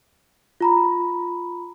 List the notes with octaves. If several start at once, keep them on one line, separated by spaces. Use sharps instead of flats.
F4 A#5 B5